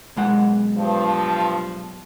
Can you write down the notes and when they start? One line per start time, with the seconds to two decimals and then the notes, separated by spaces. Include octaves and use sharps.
0.16 B1 G#3 F#5
0.77 G2 F3